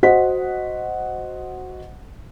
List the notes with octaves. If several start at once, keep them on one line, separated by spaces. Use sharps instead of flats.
F#4 C5 D#5 F#5 B6